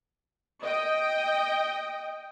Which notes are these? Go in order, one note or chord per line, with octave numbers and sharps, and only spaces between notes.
D#5 G5